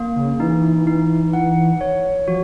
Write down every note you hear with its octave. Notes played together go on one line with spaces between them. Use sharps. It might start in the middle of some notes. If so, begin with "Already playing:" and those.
Already playing: A#3
C#3
E3 D#4
D#4
F#5
C#5
F3 F#4